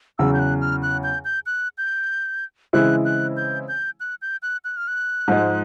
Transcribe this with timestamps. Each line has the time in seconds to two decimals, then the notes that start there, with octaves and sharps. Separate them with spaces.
0.18 E2 C#3 F#3 E6
0.34 G6
0.39 F#6
0.61 F6
0.83 F#6
1.04 G6
1.25 G6
1.46 F#6
1.78 G6
2.73 C#3 E3 G#3 C4 E4 F#6
3.05 F#6
3.37 G6
3.68 G6
4.00 F#6
4.22 G6
4.42 F#6
4.65 F#6
4.77 F6
4.88 F#6
5.28 G#2 F3 G#3